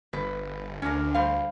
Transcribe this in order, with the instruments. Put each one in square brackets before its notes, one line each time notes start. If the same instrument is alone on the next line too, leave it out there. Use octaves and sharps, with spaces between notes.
[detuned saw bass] G1 [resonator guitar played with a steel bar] B4
[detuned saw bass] D2 [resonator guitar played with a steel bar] C#4 D4 A#4
[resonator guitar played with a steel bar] G3 C5 F5